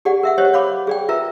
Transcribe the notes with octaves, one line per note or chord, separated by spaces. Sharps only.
G4 G#4 D5 F#5
A#4 E5 F#5
G4 C5 C#5 D#5
C#5 F5 B5 D6
G#4 D5 G5
F4 A#4 B4 E5 A#5